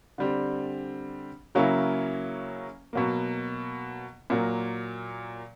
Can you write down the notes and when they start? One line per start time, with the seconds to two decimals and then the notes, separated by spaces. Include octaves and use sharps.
0.18 D3 G3 C4
1.55 C#3 F#3 A#3 C#4 E4
2.93 B2 F#3 A#3
4.30 A#2 F#3 A#3